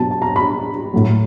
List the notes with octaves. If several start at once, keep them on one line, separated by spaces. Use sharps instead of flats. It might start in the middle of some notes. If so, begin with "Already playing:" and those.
Already playing: B2 F#3 A5
A5
A#5
B5
A2 F#3